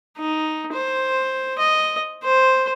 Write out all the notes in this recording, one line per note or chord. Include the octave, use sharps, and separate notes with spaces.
D#4
C5
D#5
C5